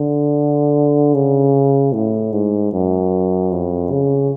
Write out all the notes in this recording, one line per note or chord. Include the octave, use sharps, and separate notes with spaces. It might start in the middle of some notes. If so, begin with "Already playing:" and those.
Already playing: D3
C#3
A2
G#2
F#2
F2
C#3